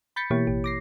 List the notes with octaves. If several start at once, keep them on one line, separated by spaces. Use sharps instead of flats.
B5 G6 A6 B6 C#7
B2 E3 A#3 E4 G4 C#5
A1 G4
D6 A#6 C7